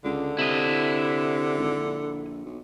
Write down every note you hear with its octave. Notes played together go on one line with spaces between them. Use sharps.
C#2 D3
C3 E4 D#5
G#1
A#1
B1